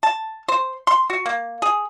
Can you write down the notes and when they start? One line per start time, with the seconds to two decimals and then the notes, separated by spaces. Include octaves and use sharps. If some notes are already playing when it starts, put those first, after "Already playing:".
0.03 A5
0.48 C5
0.87 C6
1.10 F#4
1.26 A#3
1.62 G#4